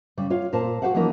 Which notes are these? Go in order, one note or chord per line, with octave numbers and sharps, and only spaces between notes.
C#3 G3
F4 C#5 F5
A#2 A#4 C5 A5
F#4 G4 B4 C5 F5 F#5
E3 F3 A#3 C#4 D#4 A#4